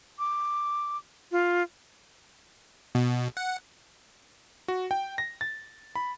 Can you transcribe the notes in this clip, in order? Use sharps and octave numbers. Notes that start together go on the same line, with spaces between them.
D6
F4
B2
F#5
F#4
G5
A#6
A6
B5